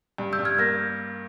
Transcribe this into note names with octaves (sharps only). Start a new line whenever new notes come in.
G2
E6 G6
G2
F6 G#6
A#3 G6 A#6